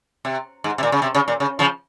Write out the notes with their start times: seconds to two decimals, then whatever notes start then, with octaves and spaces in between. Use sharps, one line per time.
0.25 C3
0.64 G#2
0.78 C3
0.83 A#2
0.92 C#3
1.02 C3
1.15 C#3
1.28 A#2
1.40 C#3
1.59 C#3 F3